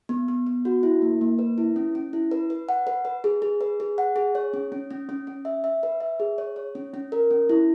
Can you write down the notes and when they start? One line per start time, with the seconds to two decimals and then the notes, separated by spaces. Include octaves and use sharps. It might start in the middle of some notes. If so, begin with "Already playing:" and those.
0.09 B3
0.28 B3
0.46 B3
0.65 F#4
0.83 E4
1.02 A#3
1.21 A#3
1.39 B4
1.58 E4
1.76 C#4
1.95 C#4
2.13 E4
2.31 B4
2.50 B4
2.69 F#5
2.87 B4
3.05 B4
3.24 G#4
3.42 G#4
3.61 B4
3.80 G#4
3.98 F#5
4.16 G#4
4.35 C#5
4.54 C#4
4.72 C#4
4.91 C#4
5.09 C#4
5.27 C#4
5.45 E5
5.64 E5
5.83 B4
6.00 E5
6.20 G#4
6.38 C#5
6.56 C#5
6.75 C#4
6.94 C#4
7.12 A#4
7.31 C#4
7.49 E4